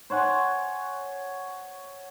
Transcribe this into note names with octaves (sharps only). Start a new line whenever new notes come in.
C5 C#5 F#5 G#5